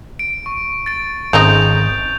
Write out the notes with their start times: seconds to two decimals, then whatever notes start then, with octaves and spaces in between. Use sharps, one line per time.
0.19 D7
0.46 C#6
0.86 A6 D7
1.33 G#1 C#3 C4 D#4 G6 F7